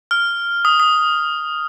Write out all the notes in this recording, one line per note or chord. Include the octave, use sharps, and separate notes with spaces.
F6
D#6
D#6